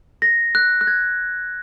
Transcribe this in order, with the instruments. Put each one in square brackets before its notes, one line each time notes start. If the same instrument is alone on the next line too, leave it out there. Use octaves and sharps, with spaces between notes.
[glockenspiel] A#6
F#6
F#6
G#6